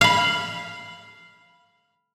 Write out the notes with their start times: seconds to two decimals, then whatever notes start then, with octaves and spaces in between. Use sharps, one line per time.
0.01 F5 B5